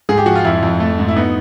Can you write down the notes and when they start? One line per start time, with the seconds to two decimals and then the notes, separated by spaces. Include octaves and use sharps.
0.09 G#2 G#4
0.18 G4
0.26 F3 F#4
0.35 F4
0.45 F2 E4
0.63 F2
0.80 A3
0.99 G#2
1.08 E4
1.16 B3 D#4